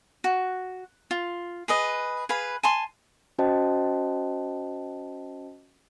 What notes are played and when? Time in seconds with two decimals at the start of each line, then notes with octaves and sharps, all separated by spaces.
0.24 F#4
1.11 F4
1.68 G#4 B4 D#5
2.29 G#4 B4 F5 B5
2.63 G#5 A5 C6
3.38 C#4 F#4 C5 D#5 G5 A5